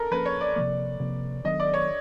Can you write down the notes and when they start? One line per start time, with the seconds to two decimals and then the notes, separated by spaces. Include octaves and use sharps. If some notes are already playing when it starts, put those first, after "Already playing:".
Already playing: A4 A#4
0.11 F3 A#3 C#4 B4
0.25 C#5
0.41 D5
0.55 C3 F3 A#3 D5
1.00 C3 F3 A#3
1.45 D#3 F#3 B3 D4 D#5
1.60 D5
1.74 C#5